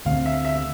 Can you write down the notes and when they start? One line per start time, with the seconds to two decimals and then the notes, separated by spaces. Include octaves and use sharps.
0.05 D2 D3 A3 C4 F5
0.26 E5
0.45 E5